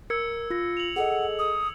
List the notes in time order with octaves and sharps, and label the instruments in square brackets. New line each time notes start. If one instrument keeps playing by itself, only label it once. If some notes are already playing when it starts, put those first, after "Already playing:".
[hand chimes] A#4 [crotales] E6 G#6 C#7
[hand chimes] F4 A#6
[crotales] F7 F#7
[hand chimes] G#4 A4 D#5 [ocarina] F#5
[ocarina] D#6